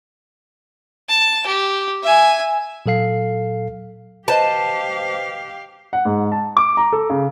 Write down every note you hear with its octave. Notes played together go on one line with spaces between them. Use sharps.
A5
G4
E5 G#5
A#2 F#3 A4 F5 C7
G4 B4 C5 D#5 F5 A5
F#5
G#2
A5
D6
A#5
A4
C#3